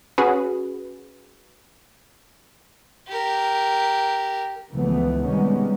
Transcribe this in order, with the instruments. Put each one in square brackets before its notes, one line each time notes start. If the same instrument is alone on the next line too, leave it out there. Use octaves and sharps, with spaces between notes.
[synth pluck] C#4 F#4 G#4 B4
[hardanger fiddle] G4 A#4
[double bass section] C#2 C#3 E3 F3 A3 B3
C3 D#3 G3 G#3 B3 C#4